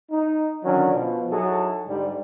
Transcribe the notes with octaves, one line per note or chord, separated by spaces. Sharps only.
D#4
D3 D#3 F#3 C#4 D4
B2 F3
F#3 D#4 E4 F#4 G#4 A4
G#2 D3 G3